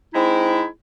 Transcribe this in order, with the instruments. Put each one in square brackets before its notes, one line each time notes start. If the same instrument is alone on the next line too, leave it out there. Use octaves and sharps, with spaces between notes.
[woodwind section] G#3 C4 D#4 E4